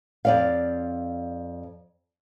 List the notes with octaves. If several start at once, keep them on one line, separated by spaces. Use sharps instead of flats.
F2 D5 F5